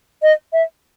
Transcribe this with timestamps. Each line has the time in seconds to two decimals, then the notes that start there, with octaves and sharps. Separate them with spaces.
0.22 D#5
0.53 E5